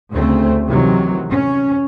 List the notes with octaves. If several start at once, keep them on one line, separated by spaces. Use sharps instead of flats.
D2 C#3 A3 C4
C3 D#3 E3 F#3
C#4